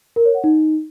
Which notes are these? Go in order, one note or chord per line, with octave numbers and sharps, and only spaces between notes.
A#4
C#5
F#5
D#4